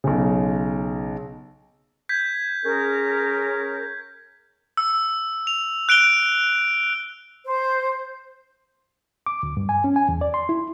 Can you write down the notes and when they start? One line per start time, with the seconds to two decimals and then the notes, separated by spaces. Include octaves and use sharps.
0.04 B1 C#3
2.09 G6 G#6 B6
2.65 C#4 G#4 A#4
4.77 E6
5.47 F7
5.89 F#6 D7 F7 G7
7.46 C5
9.26 D6
9.43 D2
9.57 G2
9.69 G#5
9.84 C#4
9.96 G#5
10.09 E2
10.21 D5
10.34 C6
10.49 E4